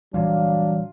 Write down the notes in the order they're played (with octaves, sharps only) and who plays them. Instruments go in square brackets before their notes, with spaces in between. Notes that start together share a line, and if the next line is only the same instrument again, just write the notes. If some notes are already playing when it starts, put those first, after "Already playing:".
[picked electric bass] A#2 E3 G3 [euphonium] F#3 [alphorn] D4 [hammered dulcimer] F4